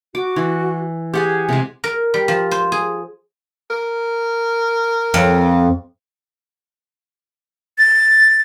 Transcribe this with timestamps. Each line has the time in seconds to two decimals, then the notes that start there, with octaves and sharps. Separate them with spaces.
0.15 F#4 D6
0.36 E3
1.14 G4 G#4 F#5 G#5
1.49 C3 G#3
1.84 A#4
2.14 G3
2.28 F3
2.51 C5
2.72 G#4
3.70 A#4
5.14 F2
7.78 A6